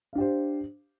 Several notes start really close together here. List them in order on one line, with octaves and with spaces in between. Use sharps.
F5 D4 G4 C5